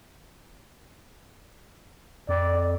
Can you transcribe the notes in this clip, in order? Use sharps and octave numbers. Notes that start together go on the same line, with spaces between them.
F2 D5